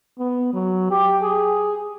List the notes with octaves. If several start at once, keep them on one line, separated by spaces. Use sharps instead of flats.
B3
F#3
G4
G#4